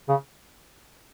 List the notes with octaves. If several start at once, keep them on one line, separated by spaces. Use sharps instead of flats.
C#3